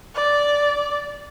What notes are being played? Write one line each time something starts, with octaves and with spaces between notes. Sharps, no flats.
D5